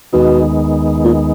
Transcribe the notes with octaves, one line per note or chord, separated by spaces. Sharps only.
D#2 B2 D#3 G#3 B3 D#4
A#2